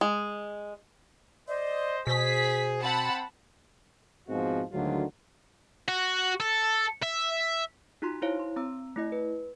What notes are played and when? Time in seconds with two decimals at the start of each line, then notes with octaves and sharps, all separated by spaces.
0.01 G#3
1.48 C5 D5 D#5
2.07 B2 G#4 C5 B6
2.82 C4 F#5 A5 B5
4.29 G#2 B2 F3 G#3 C4 F#4
4.73 D2 G#2 D3 D#3 F#3 F4
5.88 F#4
6.40 A4
7.03 E5
8.02 D#4 F4 F#4 A#5 C6
8.22 E4 C5 C#5 F5 A#5
8.40 C6
8.56 C4 A#5 E6
8.96 A3 E4 D#5
9.12 B4